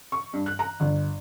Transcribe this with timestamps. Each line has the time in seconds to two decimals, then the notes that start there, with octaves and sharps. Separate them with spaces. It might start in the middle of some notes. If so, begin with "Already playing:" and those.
0.12 C#6
0.33 G2
0.46 F#6
0.59 A#5
0.80 G1